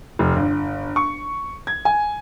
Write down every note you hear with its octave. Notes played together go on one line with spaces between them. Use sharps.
F1
G1
C#6
G#6
G#5